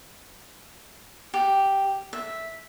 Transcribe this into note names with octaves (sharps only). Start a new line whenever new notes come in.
G4
E5